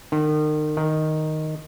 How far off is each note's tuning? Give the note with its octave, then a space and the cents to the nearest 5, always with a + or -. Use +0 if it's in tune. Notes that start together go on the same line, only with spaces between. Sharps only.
D#3 -35
D#3 +0